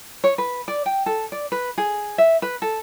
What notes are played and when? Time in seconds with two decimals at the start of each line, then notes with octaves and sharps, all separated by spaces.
0.24 C#5
0.38 B4
0.68 D5
0.86 G5
1.06 A4
1.32 D5
1.52 B4
1.78 G#4
2.18 E5
2.42 B4
2.62 A4